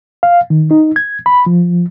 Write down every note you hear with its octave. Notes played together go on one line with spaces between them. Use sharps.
F5
D#3
D#4
G#6
B5
F3